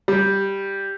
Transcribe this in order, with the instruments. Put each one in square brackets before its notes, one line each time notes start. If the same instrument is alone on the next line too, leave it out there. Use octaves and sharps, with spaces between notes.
[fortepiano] G3